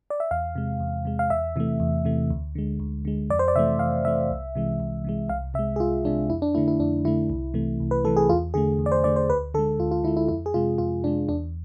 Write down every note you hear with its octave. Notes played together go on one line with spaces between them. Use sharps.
D5
E5
E2 F5
C3 G#3
E2
C3 G#3
F5
E2 E5
C3 E3 A3
E2
C3 E3 A3
D2
D3 G#3
D2
D3 G#3
F2 D5
C5
D5
C3 E3 A3 E5
F2 F5
C3 E3 A3 E5
C2
C3 E3 G#3
C2
C3 E3 G#3
C2 F5
C3 G#3 E5
G#4
C2 F4
C3 G#3 D4
F2 E4
D4
D3 A3 E4
E4
F2 D4
D3 A3 E4
C2
C3 E3 A3
C2
B4
C3 E3 A3 A4
G#4
E2 F4
D3 A3 G#4
E2
D5
C5
D3 A3 D5
C5
D2 B4
D3 G#3 A4
D2 F4
F4
D3 G#3 E4
E4
F2 E4
G#4
C3 G#3 F4
F2 F4
C3 G#3 D4
E2 D4